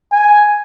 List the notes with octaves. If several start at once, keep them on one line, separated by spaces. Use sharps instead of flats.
G#5